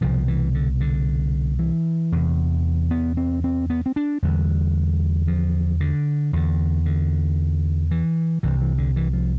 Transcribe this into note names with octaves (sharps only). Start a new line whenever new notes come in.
C2 B2 F3
E3
D3
D3
E3
E2 C3
B3
C4
C4
B3
C4
D4
E2 D3 G3
F3
D3
E2 D3
D3
E3
C2 C3 E3
E3
D3
E3
F3